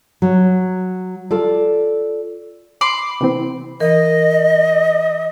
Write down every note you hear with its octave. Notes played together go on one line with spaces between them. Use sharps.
F#3
F4 A4 D5
B5 C6 D6 C7
C3 E3 C4
E3 A#4 D#5